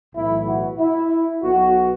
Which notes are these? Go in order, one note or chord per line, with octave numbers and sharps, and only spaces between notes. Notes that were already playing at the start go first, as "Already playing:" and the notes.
B1 A2 E3 E4
F#4
E4
B1 B2 F#4